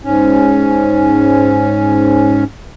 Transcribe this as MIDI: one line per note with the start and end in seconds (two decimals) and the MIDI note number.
0.03 2.44 44
0.03 2.44 61